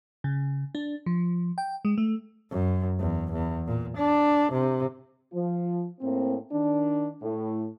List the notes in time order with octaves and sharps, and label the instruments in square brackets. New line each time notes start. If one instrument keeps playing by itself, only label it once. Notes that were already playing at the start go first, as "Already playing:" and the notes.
[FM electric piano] C#3
D4
F3
G5
G#3
A3
[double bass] F#2
E2
E2
A#2
D4
C3
[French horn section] F3
A2 A#3 C4
D#3 D4
A2